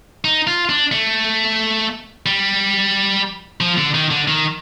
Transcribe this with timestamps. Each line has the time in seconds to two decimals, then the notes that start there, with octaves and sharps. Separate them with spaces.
0.25 D#4
0.47 F4
0.69 D4
0.92 A3
2.26 G3
3.61 F3
3.77 D3
3.94 D#3
4.10 D3
4.28 D#3